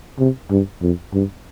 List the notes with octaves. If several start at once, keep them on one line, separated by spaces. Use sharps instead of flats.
C3
G2
F2
G2